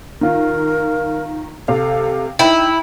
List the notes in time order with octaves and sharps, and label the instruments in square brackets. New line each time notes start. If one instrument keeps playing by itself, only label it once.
[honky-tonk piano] D#3 F4 [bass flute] A#4
[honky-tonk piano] C3 F5 [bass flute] A4
[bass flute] D#4 [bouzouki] E4 [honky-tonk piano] G5